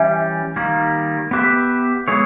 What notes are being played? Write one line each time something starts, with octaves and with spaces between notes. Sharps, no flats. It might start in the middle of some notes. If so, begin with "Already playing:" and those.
Already playing: E3 G3 C#4 E5 G#5
D#3 G3 A#3
B3 G4 B4 E5
G#3 B3 E4 G#4 C#5